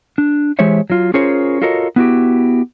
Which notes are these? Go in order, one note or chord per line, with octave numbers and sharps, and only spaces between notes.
D4
E3 G#3 G4 C5 C#5 E5
F#3 F4
C#4 F4 G#4 A#4 C5 C#5
F4 F#4 A4 A#4 C#5 D#5
B3 E4 F#4 G4